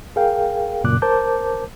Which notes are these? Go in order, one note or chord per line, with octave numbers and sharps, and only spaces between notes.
G#4 A#4 F5 G5
F#2 A#2 C#3 D6 F#6
A#4 C5 A5 D6 G6